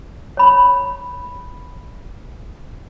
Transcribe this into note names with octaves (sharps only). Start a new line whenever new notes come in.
C#5 B5